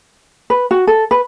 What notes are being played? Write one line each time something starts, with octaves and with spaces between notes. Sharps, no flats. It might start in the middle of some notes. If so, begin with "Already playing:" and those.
B4
F#4
A4
B4